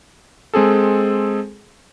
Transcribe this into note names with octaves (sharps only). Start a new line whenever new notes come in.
G#3 C4 G#4 A4